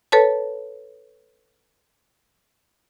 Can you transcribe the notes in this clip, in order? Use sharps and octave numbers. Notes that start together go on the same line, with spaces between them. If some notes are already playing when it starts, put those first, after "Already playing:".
A4 B4 C#5 A5